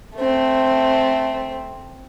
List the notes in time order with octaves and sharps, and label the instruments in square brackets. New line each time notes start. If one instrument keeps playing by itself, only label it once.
[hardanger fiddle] A3 C4